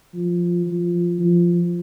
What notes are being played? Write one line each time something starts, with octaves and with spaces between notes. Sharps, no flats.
F3
F3
F3